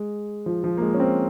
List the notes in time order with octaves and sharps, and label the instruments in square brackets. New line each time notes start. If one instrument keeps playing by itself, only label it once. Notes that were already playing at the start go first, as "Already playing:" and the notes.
Already playing: [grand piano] G#3
F3
F3
A#3
G#3
C#4
C4